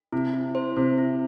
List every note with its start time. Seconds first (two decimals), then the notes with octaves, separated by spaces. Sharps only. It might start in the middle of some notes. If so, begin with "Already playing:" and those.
0.12 C3 E4
0.34 E4
0.55 C5
0.76 C3 E4
0.98 E4